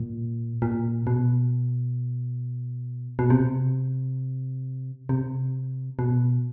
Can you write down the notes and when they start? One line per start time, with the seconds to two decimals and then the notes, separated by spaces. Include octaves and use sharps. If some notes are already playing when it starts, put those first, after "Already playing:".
Already playing: A#2
0.62 A#2
1.07 B2
3.19 B2
3.30 C3
5.09 C3
5.99 B2